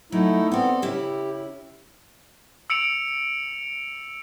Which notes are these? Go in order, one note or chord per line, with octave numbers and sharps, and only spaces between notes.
F#3 A3 D#4 E4
B3 C4 A4 D5
C#3 E4 G4
E6 C#7 D7 F7